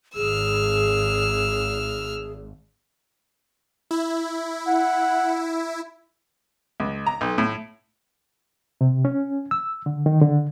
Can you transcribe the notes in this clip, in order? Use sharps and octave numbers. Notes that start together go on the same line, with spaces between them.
G#1 G#4 E6 F6
E4
F#5
C#2
A#5
B1
A2
C3
C#4
E6
D3
D#3
D3